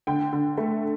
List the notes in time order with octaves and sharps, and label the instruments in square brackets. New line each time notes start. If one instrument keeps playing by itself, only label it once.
[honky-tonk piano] D3 G5
D3
A3